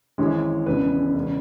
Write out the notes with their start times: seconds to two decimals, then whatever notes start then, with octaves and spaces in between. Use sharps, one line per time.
0.18 G#1 F#2 E3 G#3 C#4
0.66 E1 E2 C#3 B4
1.15 E1 C#3